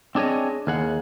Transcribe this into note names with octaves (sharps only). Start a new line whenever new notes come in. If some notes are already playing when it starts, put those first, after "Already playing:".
C4 D4 G#4 C#5 D#5
D#2 G#4 F#5